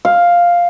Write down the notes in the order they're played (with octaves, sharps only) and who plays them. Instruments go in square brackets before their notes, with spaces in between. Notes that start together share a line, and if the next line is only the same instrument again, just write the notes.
[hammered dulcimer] F5